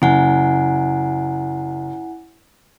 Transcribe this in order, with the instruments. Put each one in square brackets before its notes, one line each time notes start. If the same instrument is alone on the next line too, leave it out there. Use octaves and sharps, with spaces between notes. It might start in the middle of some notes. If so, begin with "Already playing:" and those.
[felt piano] F#1 [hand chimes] E4 F#5 G#5